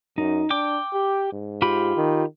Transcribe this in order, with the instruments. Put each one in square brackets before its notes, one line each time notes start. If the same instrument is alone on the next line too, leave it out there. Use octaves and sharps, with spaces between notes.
[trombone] F#2 [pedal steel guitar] D#4
[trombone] D4 [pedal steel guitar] G5 D6
[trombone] G4
G#2
[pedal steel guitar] F4 G4 B5
[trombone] D#3